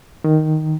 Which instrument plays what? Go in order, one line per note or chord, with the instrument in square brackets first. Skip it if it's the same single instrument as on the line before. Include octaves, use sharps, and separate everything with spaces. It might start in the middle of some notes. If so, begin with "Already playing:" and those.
[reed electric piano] D#3